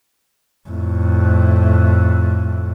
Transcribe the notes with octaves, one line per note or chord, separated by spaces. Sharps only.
F2 A2